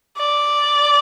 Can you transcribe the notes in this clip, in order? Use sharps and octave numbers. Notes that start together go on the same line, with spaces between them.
D5